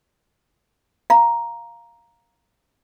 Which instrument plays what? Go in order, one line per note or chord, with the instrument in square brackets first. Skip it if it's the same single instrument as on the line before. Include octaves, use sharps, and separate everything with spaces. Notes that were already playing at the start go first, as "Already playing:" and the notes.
[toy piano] F5 A#5